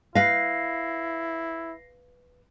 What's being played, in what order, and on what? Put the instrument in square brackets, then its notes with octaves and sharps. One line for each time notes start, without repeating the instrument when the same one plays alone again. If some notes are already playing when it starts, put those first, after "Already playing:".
[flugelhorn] E4 [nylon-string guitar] B4 F5 [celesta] A#6 C7